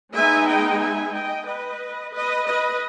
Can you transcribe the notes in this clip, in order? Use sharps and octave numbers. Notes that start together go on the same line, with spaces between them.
G#3 B3 D#4 E5 G#5
D#5 G5
E5 G#5
D#5 G5
B4 D#5
B4 D#5
B4 D#5